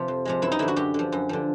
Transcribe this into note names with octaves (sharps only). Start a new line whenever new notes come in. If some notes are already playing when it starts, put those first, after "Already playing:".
Already playing: C3 F3
F2
C3 F3 G#3
F#2 E4
D#4
D3 F3 E4
F#4
F#2 G4
D3 F3
F#2
D3 F3